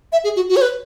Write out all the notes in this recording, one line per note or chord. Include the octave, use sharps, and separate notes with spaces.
E5
G#4
F#4
F#4
C#5
B4